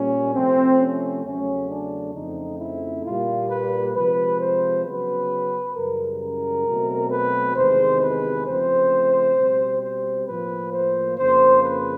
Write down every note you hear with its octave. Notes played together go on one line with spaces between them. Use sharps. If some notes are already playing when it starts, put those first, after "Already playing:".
Already playing: A#2 G3 A#3 C#4
C3 F3 A3 C4
C#4
E2 C#3 F#3 A3 C#4
D4
F2 C#3 F3 A3 C4 D#4
E4
A#2 G3 A#3 F4
B4
C3 F3 G#3 B4
C5
C#3 F#3 B3 B4
F#2 C#3 E3 G3 A#4
A#4
B2 F#3 A3 C4
B4
E2 C3 D#3 G#3 C5
B4
C#3 F3 A3 C4 C5
B2 G3 C4
C5
A2 F3 A#3 B4
C5
F2 C#3 F3 A#3 C5
B4